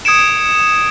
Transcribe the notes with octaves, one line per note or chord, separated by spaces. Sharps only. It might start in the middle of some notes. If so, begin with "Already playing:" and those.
D#6 G#6 C#7 D7 E7